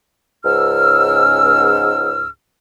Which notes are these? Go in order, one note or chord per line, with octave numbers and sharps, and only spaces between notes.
C#2 G#2 E6 F6